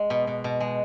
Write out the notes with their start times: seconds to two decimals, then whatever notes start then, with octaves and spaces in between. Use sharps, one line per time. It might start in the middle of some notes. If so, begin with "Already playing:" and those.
Already playing: G#3
0.10 B2
0.27 B2
0.44 B2
0.60 G#3